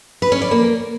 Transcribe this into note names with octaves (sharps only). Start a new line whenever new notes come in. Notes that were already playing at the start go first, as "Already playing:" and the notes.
B4
C#4
D5
A#3